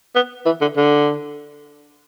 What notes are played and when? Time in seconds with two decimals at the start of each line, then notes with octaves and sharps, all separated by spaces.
0.15 B3
0.46 E3
0.61 D3
0.77 D3